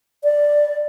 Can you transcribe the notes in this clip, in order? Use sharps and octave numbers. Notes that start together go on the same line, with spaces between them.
D5